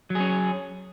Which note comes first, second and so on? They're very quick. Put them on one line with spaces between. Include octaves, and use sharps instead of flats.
F#3 G#4 C#4